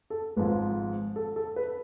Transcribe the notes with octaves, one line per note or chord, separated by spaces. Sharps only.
A4
G#1 G#2 F3 B4
A4
A4
B4